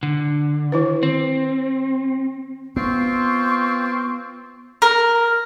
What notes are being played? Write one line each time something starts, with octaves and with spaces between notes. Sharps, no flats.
D3
D#3 E4 B4
C4
B3 C4 F4 C#6
A#4